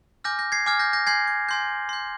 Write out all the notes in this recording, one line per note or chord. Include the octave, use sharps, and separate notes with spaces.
G#5 D6 F6 G6 A#6
G6 A#6
G#6 C7
G#5 D6 F6 G#6
G6 A#6
G6 A#6
G#5 C6 G6 G#6 C7
G#6
G#5 C6 G6
C6 G6